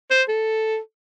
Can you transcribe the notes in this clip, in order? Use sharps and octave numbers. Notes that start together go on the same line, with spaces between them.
C5
A4